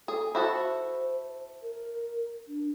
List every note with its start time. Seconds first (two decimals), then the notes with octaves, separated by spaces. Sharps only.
0.08 G#4 A4
0.35 E4 F#4 A4 C5
1.63 A#4
2.48 D4